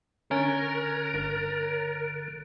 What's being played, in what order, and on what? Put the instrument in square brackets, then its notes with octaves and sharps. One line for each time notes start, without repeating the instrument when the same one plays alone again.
[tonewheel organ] D3 [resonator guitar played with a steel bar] C#4 [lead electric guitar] A#4
[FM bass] G1